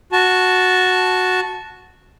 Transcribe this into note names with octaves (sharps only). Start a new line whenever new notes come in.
F#4 A5